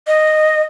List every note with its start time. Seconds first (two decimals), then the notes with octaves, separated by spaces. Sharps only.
0.07 D#5